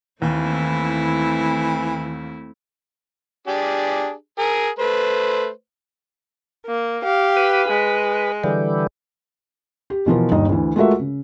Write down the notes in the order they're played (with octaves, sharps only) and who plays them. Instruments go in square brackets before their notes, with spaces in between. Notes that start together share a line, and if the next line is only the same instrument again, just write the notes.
[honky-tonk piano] D#2 [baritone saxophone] E3 [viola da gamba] A3 C4 E4
[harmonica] D4 G4 G#4
G#4 A#4
A3 B4 C5
[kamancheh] A#3
G4 F5
[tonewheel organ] B4
[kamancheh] G#3
[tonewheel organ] D3 E3 G3
[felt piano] G4
B2 E3 F3 F4 A#4
G1 D#2 D#4 D#5
D2 E3
G#3 A3 F4 F#4 A#4 E5
C#3